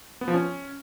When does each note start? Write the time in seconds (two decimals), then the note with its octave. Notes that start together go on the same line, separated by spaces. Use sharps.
0.21 B3
0.28 F3
0.34 C#4